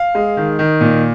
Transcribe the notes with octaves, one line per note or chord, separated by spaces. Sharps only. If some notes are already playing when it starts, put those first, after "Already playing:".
Already playing: F5
G#3
D#3
D#3
A#2